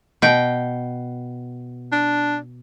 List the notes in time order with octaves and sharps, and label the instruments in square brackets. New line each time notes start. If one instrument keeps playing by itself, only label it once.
[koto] B2 G5
[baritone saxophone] D4